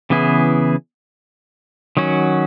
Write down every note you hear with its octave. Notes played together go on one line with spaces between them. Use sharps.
C#3 E3 B3 E4 G#4
D#3 F#3 C#4 F#4